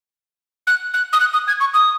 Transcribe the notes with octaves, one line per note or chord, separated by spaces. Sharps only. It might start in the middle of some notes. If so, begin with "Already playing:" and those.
F#6
F#6
D#6
F#6
D#6
G#6
C#6
D#6